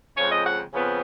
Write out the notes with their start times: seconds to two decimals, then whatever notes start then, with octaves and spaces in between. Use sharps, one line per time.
0.16 F2 C#3 F3 G#3 C#5
0.30 D#5
0.45 F#5
0.73 F2 C#3 F3 B3